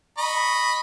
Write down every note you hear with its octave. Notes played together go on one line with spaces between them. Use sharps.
D#5 B5 C#6